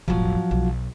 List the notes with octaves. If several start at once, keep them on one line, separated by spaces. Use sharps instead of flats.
E1 A1 F3 F#3
B1